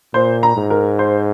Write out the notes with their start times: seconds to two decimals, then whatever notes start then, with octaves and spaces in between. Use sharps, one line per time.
0.14 A#2 C5
0.43 A#5
0.57 G#2
0.70 A#4
0.99 C5